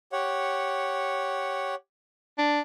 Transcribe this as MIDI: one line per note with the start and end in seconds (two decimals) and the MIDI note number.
0.12 1.75 67
0.12 1.75 73
0.12 1.75 78
2.38 2.60 62